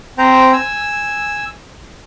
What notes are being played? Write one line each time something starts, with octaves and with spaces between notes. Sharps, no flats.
C4 C5 G5 A#5
G#5 E6